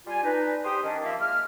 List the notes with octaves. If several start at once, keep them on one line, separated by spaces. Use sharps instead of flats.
G3 F4 G#5
D4 D#4 B4
G4 C5 C6 D#6
D#3 C#4 D4
F3 A#3 E5
G#3 A#3 F6